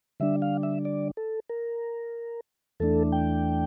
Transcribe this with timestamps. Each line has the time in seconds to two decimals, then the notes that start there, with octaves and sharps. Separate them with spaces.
0.20 D3 G3 D4 E5
0.42 F5
0.63 E5
0.85 D5
1.17 A4
1.49 A#4
2.80 E2 E3 A3 D4 A4
3.12 G5